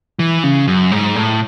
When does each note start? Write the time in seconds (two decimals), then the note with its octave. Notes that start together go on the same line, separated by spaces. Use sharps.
0.19 E3
0.43 C#3
0.67 F#2
0.92 G#2
1.15 A2